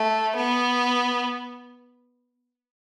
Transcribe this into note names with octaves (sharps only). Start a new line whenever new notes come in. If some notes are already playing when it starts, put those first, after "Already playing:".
Already playing: A3
B3